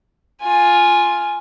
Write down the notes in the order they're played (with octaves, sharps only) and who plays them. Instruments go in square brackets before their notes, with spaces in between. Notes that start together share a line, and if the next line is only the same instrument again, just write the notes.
[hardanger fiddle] F4 G#5